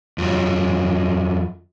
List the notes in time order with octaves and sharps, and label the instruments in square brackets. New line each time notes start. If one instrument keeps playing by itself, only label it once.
[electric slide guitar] F2 F#3